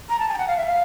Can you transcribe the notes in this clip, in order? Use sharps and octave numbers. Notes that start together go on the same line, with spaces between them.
A#5
A5
G#5
G5
F#5
F5
E5
F5